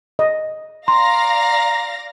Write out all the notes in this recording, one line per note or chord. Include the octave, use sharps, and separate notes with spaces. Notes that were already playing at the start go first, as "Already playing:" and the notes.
D#5
D5 F5 A#5 C6 A#6